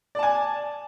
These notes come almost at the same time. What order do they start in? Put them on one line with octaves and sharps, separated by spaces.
D5 A5 G#5